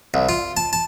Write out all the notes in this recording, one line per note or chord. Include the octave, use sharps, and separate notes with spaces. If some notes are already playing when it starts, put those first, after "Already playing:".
C2
F4
A5
A5